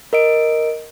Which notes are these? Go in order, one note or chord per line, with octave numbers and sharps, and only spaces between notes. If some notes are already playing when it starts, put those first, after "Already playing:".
A#4 D#5 D7